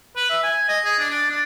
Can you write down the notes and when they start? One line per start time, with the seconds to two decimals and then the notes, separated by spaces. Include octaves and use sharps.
0.16 B4
0.30 E5
0.43 G#5
0.69 D#5
0.85 G#4
0.99 D4
1.10 D4
1.30 D4